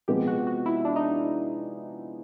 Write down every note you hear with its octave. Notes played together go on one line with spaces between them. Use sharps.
C3 F3 G#3 B3 G4
F#4
F#4
E4
D4
D#4